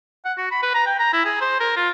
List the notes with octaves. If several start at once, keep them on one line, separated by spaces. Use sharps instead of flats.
F#5
F#4
B5
B4
A#5
G5
A#5
E4
G#4
C5
A#4
F4